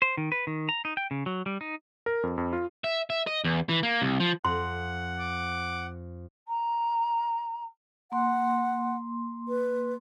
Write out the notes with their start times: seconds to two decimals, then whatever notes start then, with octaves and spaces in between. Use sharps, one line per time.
0.02 C5
0.17 D#3
0.32 B4
0.47 D#3
0.69 A#5
0.85 D#4
0.97 G5
1.11 C#3
1.26 F#3
1.46 G3
1.61 D#4
2.06 A#4
2.23 F2
2.38 F2
2.53 F4
2.84 E5
3.10 E5
3.27 D#5
3.44 E2
3.69 E3
3.83 A#3
4.02 C2
4.20 F3
4.45 F2 F#5 C6
5.19 D6
6.48 A#5
8.12 A#3 F#5 C6
9.48 B4